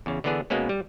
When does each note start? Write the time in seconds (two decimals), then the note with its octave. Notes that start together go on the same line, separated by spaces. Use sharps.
0.06 E2 C#3
0.24 D3 E3 B3 D4 G#4
0.50 B2 G#3 A#3 B3 C#4
0.69 G3